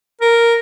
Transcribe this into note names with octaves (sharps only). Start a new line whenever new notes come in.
A#4